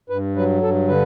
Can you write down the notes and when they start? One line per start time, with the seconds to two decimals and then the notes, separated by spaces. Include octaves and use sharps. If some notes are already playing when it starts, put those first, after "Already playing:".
0.10 G2 B4
0.35 F#3 B4
0.62 G2 A4
0.88 D3 B4